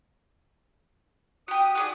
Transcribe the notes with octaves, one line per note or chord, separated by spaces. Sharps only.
F#4 G4 D#6
F#4 G#4 D5